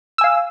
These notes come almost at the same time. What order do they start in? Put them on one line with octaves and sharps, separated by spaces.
E6 G#5 F5